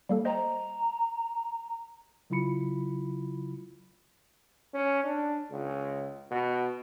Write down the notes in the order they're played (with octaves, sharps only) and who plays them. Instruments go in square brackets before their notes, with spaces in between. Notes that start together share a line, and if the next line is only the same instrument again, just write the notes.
[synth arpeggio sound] G3 A#3 A4
[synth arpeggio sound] C5 D#5 G5 [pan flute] A#5
[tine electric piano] C#3 F#3 E4 F4 B5 C#7
[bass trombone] C#4
D4
C#2
B2